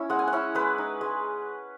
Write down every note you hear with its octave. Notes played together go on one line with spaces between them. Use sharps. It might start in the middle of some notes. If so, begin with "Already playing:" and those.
Already playing: C#4 E4
G#3 F#5
G#5
F#5
C#4 E4
G#3 B4
D#4
G#3